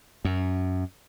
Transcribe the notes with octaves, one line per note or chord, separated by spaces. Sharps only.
F#2